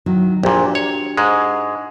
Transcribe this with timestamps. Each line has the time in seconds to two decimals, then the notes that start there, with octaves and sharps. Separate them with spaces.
0.06 D#3 F#3 E4
0.43 A#1 A#2 D4 F#4 G4
0.75 C#5
1.17 G#2 G#3